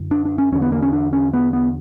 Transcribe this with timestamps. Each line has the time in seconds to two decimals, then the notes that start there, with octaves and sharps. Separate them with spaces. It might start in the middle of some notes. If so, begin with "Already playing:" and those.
Already playing: F#2 D3
0.11 D4
0.25 D4
0.38 C#4
0.52 E2 C#4
0.55 D3
0.62 B3
0.72 A#3
0.82 C#4
0.93 D4
1.13 C#4
1.34 B3
1.53 B3